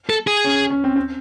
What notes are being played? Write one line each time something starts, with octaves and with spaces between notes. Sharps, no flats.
A4
G#4
C#4
C#4
C4
C4